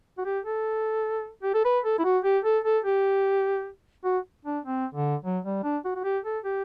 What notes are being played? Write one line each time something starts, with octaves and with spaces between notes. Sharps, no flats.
F#4
G4
A4
G4
A4
B4
A4
E4
F#4
G4
A4
A4
G4
F#4
D4
C4
D3
F#3
G3
D4
F#4
F#4
G4
A4
G4